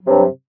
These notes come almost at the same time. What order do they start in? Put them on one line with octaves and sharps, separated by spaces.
F#3 C3 G2